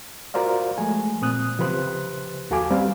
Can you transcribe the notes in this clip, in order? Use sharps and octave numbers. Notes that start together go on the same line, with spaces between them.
F4 F#4 A#4 C5 D5 F5
F3 G#3 A3 G#5
A#2 C4 D#6 F#6
C#3 F3 G4 B4 C5 F#6
D#2 F#4 A4 F5 G#5 D6
C2 G3 C4 C#4 B4 F5